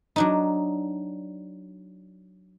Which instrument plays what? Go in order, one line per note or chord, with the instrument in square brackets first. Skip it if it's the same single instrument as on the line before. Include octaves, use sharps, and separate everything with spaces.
[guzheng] F#3 D4 D#4